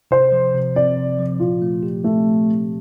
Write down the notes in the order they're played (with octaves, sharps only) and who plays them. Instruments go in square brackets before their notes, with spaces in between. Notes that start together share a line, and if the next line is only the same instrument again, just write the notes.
[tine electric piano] C3 [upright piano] C5
[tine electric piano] F3
C3
[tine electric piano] C4 [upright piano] D5
[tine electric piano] C3
F3
[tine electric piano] A#2 [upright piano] F4
[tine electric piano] A3
G4
[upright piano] A3 [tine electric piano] C4